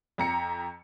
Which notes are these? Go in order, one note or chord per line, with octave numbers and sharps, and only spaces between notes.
F2 A#5 C#7